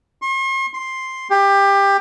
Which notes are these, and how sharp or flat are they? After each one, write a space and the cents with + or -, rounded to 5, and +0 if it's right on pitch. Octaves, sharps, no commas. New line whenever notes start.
C6 +45
C6 +5
G4 +20